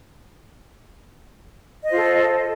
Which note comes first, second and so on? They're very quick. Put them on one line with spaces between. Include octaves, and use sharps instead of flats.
D#5 C5 F4 A4